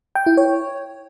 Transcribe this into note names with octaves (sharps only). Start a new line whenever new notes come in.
G5
E4
C#5